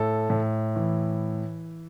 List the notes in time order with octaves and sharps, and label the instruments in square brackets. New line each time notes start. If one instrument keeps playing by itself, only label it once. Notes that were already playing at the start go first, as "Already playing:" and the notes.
Already playing: [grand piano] A2 A4
A2
E3